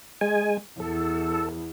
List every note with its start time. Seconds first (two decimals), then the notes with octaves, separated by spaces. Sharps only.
0.21 G#3 G#5
0.80 E2 A4